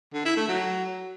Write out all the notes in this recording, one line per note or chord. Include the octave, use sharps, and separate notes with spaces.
D3
E4
A3
F#3